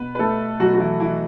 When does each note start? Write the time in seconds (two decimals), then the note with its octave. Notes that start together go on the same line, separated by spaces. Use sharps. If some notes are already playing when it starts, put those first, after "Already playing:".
Already playing: B2 B3 B4
0.15 B4
0.19 A3 A4
0.59 B2 F#3 F#4
0.74 F#4
0.79 E3 E4
1.00 E3 E4